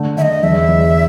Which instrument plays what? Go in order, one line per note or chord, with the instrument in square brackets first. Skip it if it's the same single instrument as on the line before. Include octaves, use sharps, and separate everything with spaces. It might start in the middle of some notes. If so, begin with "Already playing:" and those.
Already playing: [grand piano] D3 A3
[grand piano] D3 [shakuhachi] E5
[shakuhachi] D#5
[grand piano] E2 [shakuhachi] E5
[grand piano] E2